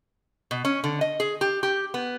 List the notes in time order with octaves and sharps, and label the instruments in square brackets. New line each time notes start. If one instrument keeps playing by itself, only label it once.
[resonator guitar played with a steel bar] B2
C#4
D3
D#5
G#4
G4
G4
B3